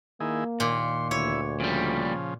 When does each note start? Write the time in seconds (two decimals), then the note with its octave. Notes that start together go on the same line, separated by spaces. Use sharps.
0.20 D#3 A#3 E4 G#4
0.60 D#2 A#2 C6
1.11 D2 E4 C#5
1.60 A#2 C#3 F3 G3